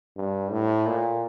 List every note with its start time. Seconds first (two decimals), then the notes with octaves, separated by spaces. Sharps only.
0.17 G2
0.51 A2
0.86 A#2